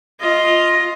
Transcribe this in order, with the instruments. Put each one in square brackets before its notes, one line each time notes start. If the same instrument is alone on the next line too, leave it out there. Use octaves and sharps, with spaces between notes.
[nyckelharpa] F4 D#5